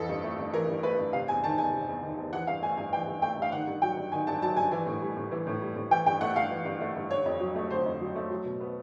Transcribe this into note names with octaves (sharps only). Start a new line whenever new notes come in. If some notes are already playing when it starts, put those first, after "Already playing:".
Already playing: F2 E3 A4
G2
A3
G2
E3 A#4
G2
A3 B4
G2
C3 F5
E2 G#5
D#3 A5
E2 G#5
C3
E2
D#3
E2
E3 F#5
G2 F5
A3 G#5
G2 G#5
E3 G5
G2
A3 G5
G2 F5
D#3 F#5
G2
F#3 G5
G2
D#3 G#5
G2 A5
F#3 A5
G2 G#5
E3 G#5
A2
G3
A2
E3
A2
G3
A2
E3 G5
G2 G5
A3 F#5
G2 F5
E3
G2
A3
G2
D3 C#5
F2
F#3
A3
D3 C5
F2
F#3
A3
F#3
B2
B3